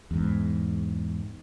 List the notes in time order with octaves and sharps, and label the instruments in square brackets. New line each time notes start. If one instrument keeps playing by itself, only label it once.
[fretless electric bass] E2 G#2